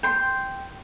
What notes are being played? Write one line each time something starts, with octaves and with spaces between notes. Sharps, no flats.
G5 C6